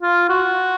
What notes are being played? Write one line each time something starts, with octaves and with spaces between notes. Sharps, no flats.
F4
F#4